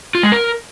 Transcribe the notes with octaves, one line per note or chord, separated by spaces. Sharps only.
F4
G#3
A#4